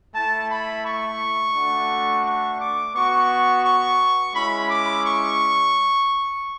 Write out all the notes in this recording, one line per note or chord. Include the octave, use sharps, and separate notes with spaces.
A3 E4 A5
B5
C#6
A3 D4 F#4
C#6
D6
B3 F#4 C#6
C#6
G#3 C#4 E4 B5
D6
C#6